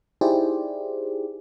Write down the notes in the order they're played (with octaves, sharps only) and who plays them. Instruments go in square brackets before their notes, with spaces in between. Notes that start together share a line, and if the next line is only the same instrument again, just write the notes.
[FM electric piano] D#4 E4 G4 G#4 C5 D5